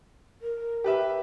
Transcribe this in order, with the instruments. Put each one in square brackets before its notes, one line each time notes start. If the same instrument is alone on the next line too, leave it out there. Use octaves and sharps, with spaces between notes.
[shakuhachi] A#4
[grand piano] G4 B4 E5